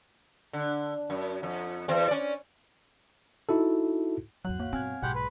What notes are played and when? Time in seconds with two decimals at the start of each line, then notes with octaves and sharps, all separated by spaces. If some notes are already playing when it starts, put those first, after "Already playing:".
0.53 D3
1.10 F#2
1.43 F2
1.88 E2 C4
2.08 C#4 D5
3.49 D#4 E4 F#4 A4
4.45 G#1 E2 F#3 F#4 F#5 F#6
4.60 A#3 C#5 F5 F#5
4.73 G2 B2 C4 G#5 F6 G#6
5.03 B1 G#2 B2 G4 G#4 F#5 B5 C6
5.15 B4